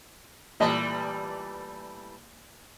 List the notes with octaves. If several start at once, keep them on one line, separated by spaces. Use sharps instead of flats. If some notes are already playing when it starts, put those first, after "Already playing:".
A#2 E3 G3 A3 D#5 A5